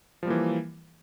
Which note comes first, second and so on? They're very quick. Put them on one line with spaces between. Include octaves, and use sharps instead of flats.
F3 G3 A#3 E3